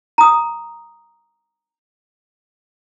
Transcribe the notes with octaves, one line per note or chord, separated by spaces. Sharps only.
A#5 D#6